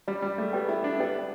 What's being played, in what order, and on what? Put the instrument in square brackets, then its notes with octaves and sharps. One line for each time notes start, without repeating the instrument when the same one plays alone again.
[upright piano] G3 [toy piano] G4 D5 G5
[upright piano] G3
A3
[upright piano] B3 [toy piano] G4 D5 G5
[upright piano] E4
D4
[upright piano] B3 [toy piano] G4 D5 G5